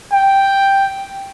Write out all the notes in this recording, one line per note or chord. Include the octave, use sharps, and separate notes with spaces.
G5